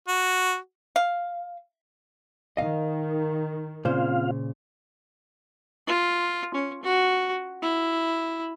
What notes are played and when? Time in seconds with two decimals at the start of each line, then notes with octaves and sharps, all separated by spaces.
0.08 F#4
0.96 F5
2.57 D#3 D#5 F5
3.85 A#2 C#3 C4 F4 C5 F5
5.87 F4
6.54 C#4
6.83 F#4
7.62 E4